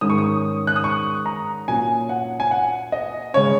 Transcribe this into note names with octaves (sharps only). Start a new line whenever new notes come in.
G#2 D#3 G#3 C#4 D#6
C#6
D#6
F#6
D#6
C#6
A#5
A#2 F#3 C#4 G#5
F#5
G#5
F#5
D#5
C#3 G#3 C#4 C#5